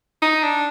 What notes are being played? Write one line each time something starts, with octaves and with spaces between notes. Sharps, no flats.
D#4
D4